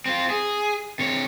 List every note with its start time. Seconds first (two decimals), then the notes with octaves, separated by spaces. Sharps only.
0.06 C4 F4
0.30 G#4
0.99 C3 C#5